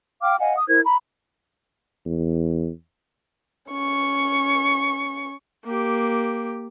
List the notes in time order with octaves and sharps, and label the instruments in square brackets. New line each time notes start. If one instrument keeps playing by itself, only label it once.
[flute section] F5 G5 D6 F6
D#5 F5 F#5 G#5
D#6
E4 A#4 C5 G#6
A#5 B5
[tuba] E2
[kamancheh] C#4 C#6
[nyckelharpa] A#3 G4